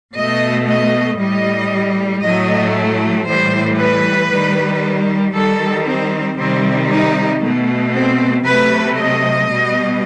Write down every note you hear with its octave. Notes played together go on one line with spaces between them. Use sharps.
B2 A3 D#5
D#5
A2 G3 D#5
A2 F#3 A3 D#5
A2 E3 G3 C5
B4
D#3 G3
D#3 G3 A4
C4
C3 D#3 G3 C4
D#4
B2 A3
C4
C3 F#3 A3 B4
D#5
B2 G3